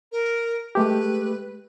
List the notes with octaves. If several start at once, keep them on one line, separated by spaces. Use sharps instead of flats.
A#4
G#3 A3 G4 B4